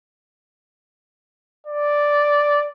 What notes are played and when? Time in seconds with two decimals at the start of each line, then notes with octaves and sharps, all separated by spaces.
1.67 D5